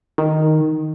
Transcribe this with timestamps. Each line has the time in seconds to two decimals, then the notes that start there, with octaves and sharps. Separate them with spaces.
0.18 D#3